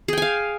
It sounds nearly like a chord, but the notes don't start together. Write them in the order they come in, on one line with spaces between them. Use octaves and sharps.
G#4 G5 G#5 F5